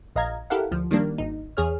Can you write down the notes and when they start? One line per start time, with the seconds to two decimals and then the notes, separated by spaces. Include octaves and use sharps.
0.16 A#1 D#5 F5 A#5 G#6
0.50 E4 G4 A4 A#4 F5 F#5
0.71 D2 F3
0.91 D#3 G3 A#3 D4
1.18 G#1 D#4
1.57 E2 G#4 C#5 F6